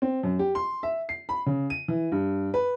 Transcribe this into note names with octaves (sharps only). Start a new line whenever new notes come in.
C4
F#2
G4
C6
E5
C7
B5
C#3
D#7
E3
G2
B4